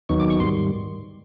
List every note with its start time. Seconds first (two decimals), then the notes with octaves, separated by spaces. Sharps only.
0.09 D#2 D#3 F#3 B3 D#4 C#6
0.20 D6
0.30 C#6
0.40 G#2 D#3 G3 C6